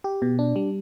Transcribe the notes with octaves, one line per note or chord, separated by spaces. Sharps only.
G4
B2
D4
G3